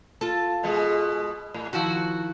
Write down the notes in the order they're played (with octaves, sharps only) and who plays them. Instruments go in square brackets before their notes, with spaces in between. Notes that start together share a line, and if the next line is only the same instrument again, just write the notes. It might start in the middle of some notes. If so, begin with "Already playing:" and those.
[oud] F4 A4
[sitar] B2 G#3
A2
[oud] D#3 F3 E4 [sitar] F#4